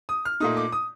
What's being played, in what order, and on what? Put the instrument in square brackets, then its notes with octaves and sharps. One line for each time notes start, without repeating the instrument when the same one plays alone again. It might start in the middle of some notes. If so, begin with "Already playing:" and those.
[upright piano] D#6
F6
A#2 A3 D#4 D#6
D6
D#6